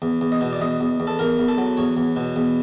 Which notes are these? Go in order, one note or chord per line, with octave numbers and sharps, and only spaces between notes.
E2
E2
D#5
B2
D5
E2 D#5
E2
E2
A4
E2 A#4
E2
A4
F#3
E2 C#5
E2
B2
E2